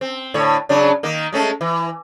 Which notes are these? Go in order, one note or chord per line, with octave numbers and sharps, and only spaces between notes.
C4
A2 D3 C#5
C#3 F#3 D4
D#3 A#3
G#3 A3 C#4
E3